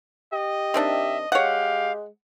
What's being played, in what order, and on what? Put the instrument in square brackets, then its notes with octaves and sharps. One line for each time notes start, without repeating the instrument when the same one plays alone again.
[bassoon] G4 [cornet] D#5
[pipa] D#3 C4 D4 [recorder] E5
[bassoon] G#3 [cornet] G4 [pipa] C#5 F#5 [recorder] F5